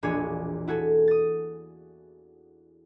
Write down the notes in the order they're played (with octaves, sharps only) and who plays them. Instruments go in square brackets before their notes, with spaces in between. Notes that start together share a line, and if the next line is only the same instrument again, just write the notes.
[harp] E1 A#1 D4 C#5 G#5
E4 F#4 G#4 A4
D#6 A6